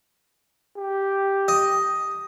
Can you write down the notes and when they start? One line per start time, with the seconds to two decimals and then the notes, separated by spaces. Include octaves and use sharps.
0.77 G4
1.48 D#5